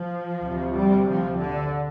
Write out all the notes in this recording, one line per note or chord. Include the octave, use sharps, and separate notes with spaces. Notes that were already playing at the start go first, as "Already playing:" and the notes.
Already playing: F3
D2 C3
G3
F3
D3